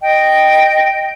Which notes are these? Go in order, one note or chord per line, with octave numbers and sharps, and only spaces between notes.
D#5 G5